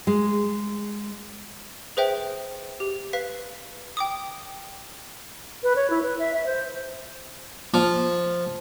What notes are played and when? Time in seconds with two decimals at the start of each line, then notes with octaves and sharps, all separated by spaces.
0.07 G#3
1.97 G#4 B4 C5 E5 G5
2.80 G4
3.13 B4 F5 B6
3.97 G5 D6 D#6
5.63 B4
5.76 C#5
5.90 E4
6.03 B4
6.19 E5
6.34 E5
6.46 C5
7.74 F3